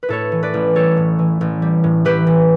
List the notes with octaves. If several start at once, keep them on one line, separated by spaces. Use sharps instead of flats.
B4
A2 A4 C#5
E3
B4 D5
A1
G3 A4 C#5
A2
E3
A1
G3
A2
E3 G4 B4
A1